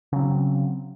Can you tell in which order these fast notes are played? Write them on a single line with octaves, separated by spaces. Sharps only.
C#3 F#3 C4